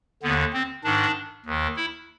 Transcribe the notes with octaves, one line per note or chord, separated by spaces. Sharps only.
D#2 D3 B3
C4
G#2 D#3 D4
D#2 D#3
E4